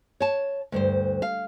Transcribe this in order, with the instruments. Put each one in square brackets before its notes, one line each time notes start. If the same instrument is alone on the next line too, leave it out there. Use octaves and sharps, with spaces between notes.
[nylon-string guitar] C#5 A5
D2 G2 C5
F5